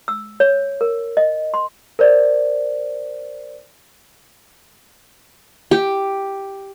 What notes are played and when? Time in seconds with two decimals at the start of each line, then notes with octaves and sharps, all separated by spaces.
0.08 E6
0.40 C#5
0.81 A#4
1.17 D#5
1.54 C6
1.99 A#4 C5 D5
5.71 G4